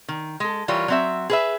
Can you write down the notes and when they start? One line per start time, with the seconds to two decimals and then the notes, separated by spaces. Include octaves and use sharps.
0.08 D#3
0.40 G#3 A4
0.68 E3 G3 F4 A#4 C#5
0.88 F#3 C4 E5
1.30 G#4 B4 E5